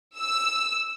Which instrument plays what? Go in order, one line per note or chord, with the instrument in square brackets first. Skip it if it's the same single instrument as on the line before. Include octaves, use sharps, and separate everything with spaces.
[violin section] E6